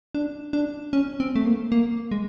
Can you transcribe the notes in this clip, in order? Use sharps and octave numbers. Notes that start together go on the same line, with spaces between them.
D4
D4
C#4
C4
A3
A#3
A#3
G#3